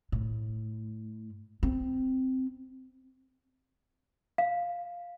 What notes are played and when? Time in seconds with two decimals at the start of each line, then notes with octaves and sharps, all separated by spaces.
0.12 A2
1.63 C4
4.38 F5